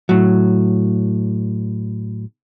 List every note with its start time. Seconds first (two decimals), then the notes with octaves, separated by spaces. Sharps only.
0.09 A2 F#3